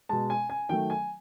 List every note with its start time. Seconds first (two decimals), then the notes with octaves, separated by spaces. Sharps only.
0.09 B2 G#3 A5
0.30 G#5
0.50 G#5
0.69 D#3 F#3 A3 G5
0.90 G#5